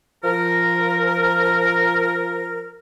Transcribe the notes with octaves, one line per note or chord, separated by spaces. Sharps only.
F3 A#4